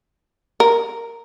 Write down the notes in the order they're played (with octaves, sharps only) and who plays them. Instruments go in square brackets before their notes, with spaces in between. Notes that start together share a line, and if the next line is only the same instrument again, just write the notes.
[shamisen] A#4